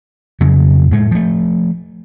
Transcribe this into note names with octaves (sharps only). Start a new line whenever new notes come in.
F2 C#3 F#3
A2 G#3 A3
F3 A3